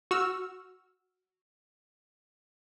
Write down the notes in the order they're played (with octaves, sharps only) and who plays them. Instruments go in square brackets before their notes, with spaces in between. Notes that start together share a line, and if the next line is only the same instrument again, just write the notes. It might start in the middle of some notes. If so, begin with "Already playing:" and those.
[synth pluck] F#4 E6 F6